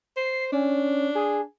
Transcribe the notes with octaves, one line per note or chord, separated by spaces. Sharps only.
C5 C7
C#4 D4
G#4